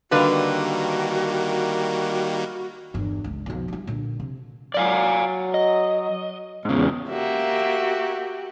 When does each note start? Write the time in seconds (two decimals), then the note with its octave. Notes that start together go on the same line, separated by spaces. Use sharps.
0.11 D3 D#3 G3 A#3 F#4 B4 F5
2.94 G1 E2
3.24 C#2
3.46 B1 F2
3.68 G3 E4
3.87 A#2 D3
4.20 C3
4.74 F#3 D5 F5 G#5
5.54 D#5
6.65 E2 G#2 C#3
7.09 A#3 F#4 G4 E5